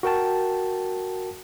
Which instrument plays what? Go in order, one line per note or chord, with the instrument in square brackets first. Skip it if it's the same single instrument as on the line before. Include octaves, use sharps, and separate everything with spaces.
[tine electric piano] F#4 A#4 G5 A5